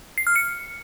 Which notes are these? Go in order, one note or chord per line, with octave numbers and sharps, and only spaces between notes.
C7
F6
C#7